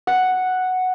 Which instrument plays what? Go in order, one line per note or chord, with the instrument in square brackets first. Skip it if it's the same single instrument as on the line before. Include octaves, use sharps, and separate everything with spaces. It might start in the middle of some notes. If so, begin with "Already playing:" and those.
[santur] F#5